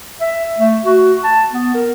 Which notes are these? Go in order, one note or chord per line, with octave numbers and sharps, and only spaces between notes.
E5
A3
F#4
A5
B3
A#4